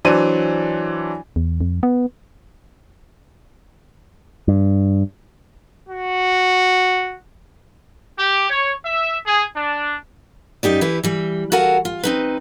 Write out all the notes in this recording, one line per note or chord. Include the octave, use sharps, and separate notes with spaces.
E3 F#3 D4 C5 D#7
E2
F2
B3
G2
F#4
G4
C#5
E5
G#4
D4
F#2 D#4 G4 D5
E3 E4 G4 B4
E3 G3
F#4 A4 A#4 F5 F#5 G#5
F4
C4 D#4 B4